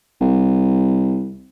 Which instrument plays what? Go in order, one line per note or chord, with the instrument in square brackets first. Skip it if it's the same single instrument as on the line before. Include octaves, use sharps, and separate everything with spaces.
[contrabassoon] C2